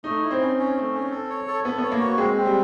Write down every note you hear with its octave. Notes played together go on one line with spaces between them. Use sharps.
A3 D#4
E4
C4
C#4
C#4
A3
C#4
A4
C#5
A4
B3 A4
B3 C#5
A#3
F#4
G#3 C4
C4
G3